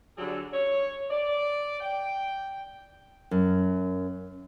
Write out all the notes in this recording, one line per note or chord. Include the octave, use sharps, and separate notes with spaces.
D3 F#3 G3 G#4 A4
C#5
D5
G5
F#2